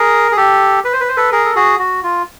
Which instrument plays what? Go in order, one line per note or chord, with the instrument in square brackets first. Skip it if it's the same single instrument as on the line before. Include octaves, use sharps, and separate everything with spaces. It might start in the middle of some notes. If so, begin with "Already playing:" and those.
Already playing: [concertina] G#4 A#4
G#4
G4 A4
B4
C5
B4
C5
A4 B4
G#4 A#4
A4
F#4 G#4
F#4
F4